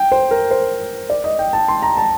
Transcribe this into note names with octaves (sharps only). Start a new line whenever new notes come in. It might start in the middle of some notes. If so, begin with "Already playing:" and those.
Already playing: G5
C5
A#4
C5
D5
D#5
G5
A5
C6
A#5
A5